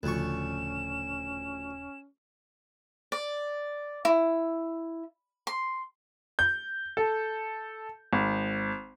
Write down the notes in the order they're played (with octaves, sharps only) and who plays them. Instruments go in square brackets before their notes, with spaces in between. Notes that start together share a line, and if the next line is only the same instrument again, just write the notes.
[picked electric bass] D#1 C#3 [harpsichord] D2 F3 C#6 [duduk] C#4 [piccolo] E7
[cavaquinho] D5
E4
C6
[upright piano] G6
A4
G#1